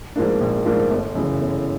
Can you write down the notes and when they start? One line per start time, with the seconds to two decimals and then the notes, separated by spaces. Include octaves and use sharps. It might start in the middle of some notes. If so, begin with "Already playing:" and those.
0.16 G#2 F3 A#3 D4
0.40 A#1
0.65 G#2 F3 A#3 D4
0.90 G1
1.15 F#2 C#3 E3
1.40 G1